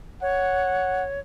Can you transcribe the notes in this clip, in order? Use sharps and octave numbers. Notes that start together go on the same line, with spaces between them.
C#5 F#5